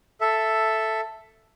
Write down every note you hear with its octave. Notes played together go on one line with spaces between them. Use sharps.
A4 E5